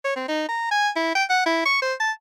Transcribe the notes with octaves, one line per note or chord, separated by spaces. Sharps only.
C#5
C4
D#4
A#5
G#5
E4
G5
F#5
E4
C#6
C5
A5